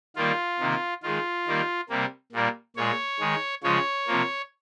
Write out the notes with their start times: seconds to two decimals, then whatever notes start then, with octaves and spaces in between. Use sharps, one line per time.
0.16 D#3 G3 A#3 F4
0.59 C3 D#3 A#3
1.03 D#3 G#3 F4
1.47 D#3 G3 A#3
1.89 C3 G3 A#3
2.33 A#2 G3 A#3
2.76 A#2 G#3 C#5
3.20 D#3 G#3
3.63 C#3 F3 G#3 C#5
4.07 C3 F3 A#3